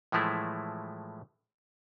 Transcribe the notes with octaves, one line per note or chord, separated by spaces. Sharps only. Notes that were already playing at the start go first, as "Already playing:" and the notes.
A2 E3 F3 G#3 A3 E4